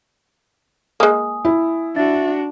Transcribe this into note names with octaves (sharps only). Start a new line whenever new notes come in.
G#3 A#3 G#5 D#6
E4
D4 F#4 E5 A6